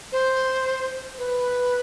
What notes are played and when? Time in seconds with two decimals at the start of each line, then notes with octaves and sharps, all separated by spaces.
0.12 C5
1.18 B4